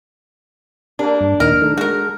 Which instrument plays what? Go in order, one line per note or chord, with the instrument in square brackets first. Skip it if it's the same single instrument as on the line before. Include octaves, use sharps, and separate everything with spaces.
[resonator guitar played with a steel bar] A#3 D4 [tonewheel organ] G4 A#4
[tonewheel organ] G2
[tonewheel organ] D#2 A#2 D#4 [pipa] A#4
[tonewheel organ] D#3 A3
[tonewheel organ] G#3 [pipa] F#4 A#4